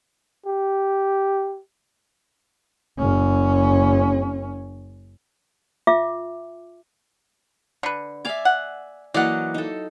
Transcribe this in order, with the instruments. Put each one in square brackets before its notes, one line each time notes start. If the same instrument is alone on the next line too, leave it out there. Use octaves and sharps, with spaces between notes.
[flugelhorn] G4
[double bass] F#1 C#4
[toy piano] F4 E5 D6
[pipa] D3 B4
[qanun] D5 F5 D6 [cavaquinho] E5 G#5
[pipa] F#5
[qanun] E3 F#3 A#3 [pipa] D5 [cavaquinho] D#5 F#5
[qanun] D#4 A4